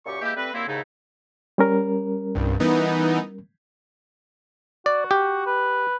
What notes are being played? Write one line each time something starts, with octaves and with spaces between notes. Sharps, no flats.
F#2 A#2 G4 C#6
E3 G#3 A#3 E4 G4
G3 A3 C4 B4
C2 F#2 A#3 C4 E4
D#2 G#2 C#3 A3 D#4 E4
G3 C#4 A#4
C2 G2
E3 B3 D#4
F#4 D5
G4
B4